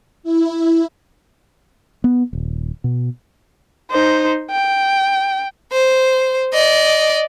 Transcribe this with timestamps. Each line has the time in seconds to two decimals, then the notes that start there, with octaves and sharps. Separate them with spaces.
0.23 E4
2.04 B3
2.33 D#1
2.84 B2
3.91 D#4 C5
4.51 G5
5.72 C5
6.53 D5 D#5